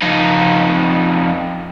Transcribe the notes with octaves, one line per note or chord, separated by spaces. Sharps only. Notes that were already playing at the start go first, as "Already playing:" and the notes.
F2 D#4